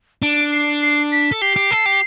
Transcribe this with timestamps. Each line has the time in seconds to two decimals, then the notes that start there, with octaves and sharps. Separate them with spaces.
0.22 D4 D7
0.52 C7
0.82 C7
1.12 B6
1.32 A4
1.41 G4 C7
1.56 G4
1.71 A4
1.86 G4